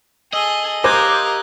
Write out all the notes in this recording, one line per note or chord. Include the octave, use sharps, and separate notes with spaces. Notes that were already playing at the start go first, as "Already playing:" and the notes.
G#4 A4 D#5 D#6 E6 G7
G4 A#4 C5 F5 D6 F#6 G#6 A#6